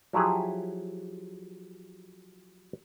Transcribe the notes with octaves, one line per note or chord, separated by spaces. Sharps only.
F3 F#3 E4 G4 G#4